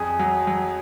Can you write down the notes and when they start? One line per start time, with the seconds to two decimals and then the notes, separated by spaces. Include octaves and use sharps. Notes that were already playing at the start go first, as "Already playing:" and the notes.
Already playing: F2 G#4
0.19 F#3
0.47 F#3